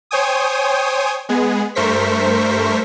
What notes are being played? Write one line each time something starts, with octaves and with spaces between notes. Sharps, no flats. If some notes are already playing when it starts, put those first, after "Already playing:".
C5 C#5 G5 G#5 D#6
G#3 B3 G#4
G2 A3 A#4 C5 C#6 B6